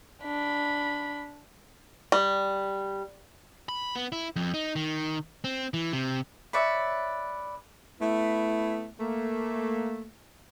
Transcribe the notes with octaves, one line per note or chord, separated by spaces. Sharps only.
D4 B5
G3
B5
B3
E4
F2
D#4
D#3
C4
E3
C3
B4 C#5 D5 E5
A3 B3 E4
A3 A#3